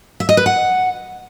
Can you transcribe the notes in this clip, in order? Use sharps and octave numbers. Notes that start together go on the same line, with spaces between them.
E5
D#5
B4
F#5